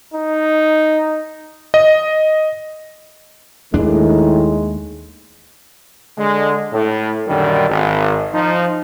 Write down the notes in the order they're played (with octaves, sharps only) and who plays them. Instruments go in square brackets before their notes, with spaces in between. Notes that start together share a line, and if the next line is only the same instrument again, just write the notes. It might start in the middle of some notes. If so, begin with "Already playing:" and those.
[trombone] D#4
[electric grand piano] D#5
[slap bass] D#2 D4 [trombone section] A2 D#3 [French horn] G#3
[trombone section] D3 G#3
A2
F#2 A#2 D3 D#3 G3
G#1
F3 D#4